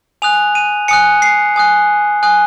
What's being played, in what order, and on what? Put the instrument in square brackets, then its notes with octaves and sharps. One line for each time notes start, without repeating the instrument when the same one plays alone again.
[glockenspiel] G#5 D#6 F#6 F7
D#7
G#5 D#6 F#6 C#7
C7
G#5 D#6 F#6
G#5 D#6 F#6